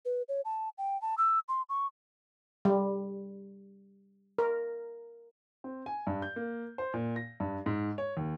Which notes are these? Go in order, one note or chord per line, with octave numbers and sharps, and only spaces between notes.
B4
C#5
A5
G5
A5
E6
C6
C#6
G3
A#4
C4
G#5
G2
G6
A#3
C5
A#2
A#6
G2
G#2
C#5
D#2